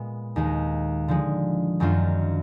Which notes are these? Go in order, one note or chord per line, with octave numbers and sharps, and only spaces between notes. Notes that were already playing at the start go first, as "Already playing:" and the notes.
Already playing: A#2 G#3 B3
D#2 D#3 G#3
D3 F3 G#3
F#2 D#3 F#3 D4 F4